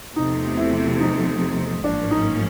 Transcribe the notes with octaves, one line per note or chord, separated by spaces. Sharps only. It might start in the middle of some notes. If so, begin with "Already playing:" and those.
E2 C3 F3 A3 D#4
E4
D#4
A1 G#2 F3 A#3 C#4 D4
D#4